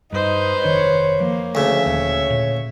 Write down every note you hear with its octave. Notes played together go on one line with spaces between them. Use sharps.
G2 D#4 B4 C5
F1 D#3 D4 C#5
F3 A#3
D2 C#3 E5
D#1 D#2 C#5
A#2